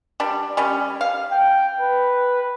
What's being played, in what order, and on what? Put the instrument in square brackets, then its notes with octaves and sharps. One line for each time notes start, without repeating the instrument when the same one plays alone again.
[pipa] G3 D4
G3 C#4
F5
[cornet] G5
B4